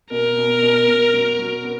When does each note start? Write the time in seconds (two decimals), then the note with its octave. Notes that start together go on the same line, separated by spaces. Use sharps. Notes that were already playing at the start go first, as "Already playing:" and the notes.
0.11 B2 A#4
0.37 B2
0.62 B2
0.87 B2
1.14 F#3
1.39 F#3
1.64 B3